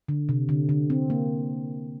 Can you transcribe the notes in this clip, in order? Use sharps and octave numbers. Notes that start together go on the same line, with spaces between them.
D3
C3
D3
D3
C4
A#3